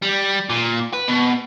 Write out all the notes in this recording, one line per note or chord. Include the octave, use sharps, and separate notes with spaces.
G3
A#2
B4
B2